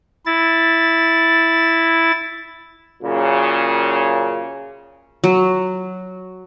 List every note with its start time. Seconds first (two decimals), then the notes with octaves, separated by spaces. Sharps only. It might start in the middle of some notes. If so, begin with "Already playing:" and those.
0.26 E4 A6
3.03 F#2 A#2 C#3
5.24 F#3